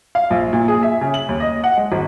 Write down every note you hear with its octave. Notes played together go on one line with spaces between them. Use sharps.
F5
A#1
A#2
G#4
E5
C#3
F#7
D#2
D#5
F#5
G#3
G#1